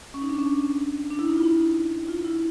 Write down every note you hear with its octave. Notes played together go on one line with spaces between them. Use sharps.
C#4
D#4
D4
C#4
D4
D4
E4
D#4
F4
E4
F4
E4